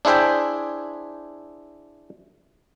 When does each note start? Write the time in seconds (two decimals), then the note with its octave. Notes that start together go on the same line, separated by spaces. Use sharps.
0.05 D4 E4 G#4 C5 E5 G5